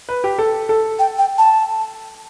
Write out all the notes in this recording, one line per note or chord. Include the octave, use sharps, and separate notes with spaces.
B4
G4
A4
A4
G5
G5
A5